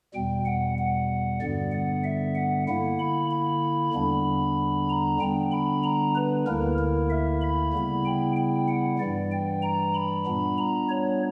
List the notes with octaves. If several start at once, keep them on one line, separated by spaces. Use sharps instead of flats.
E2 B2 G3 G5
F#5
F#5
G2 D3 G3 B3 D5
F#5
E5
F#5
D3 A#3 E4 F#5
B5
B5
E2 D3 G3 B3 D4 B5
A#5
D3 G3 B3 D4 G5
B5
A#5
B4
D2 D3 A#3 E4 A#4
A#4
E5
B5
C#3 G3 B3 E4
G5
G5
F#5
G2 E3 G3 D5
G5
A#5
B5
A#2 G3 B3 D4
A#5
C#5